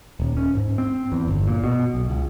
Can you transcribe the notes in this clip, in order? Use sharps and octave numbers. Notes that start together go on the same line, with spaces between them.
D#1
C#4
G#2
C4
E2
G1
A#2
B2
B1
C#2